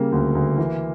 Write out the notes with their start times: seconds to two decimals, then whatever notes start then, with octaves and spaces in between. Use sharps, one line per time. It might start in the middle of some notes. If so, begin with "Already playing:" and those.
Already playing: C#3 G3 A#3
0.12 D2
0.35 D2
0.58 E3